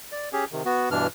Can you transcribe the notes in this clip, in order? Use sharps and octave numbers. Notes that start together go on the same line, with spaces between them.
D5
C#4 G4 G#4
C3 D#3
B3 F#4
G2 B2 E3 D4 F6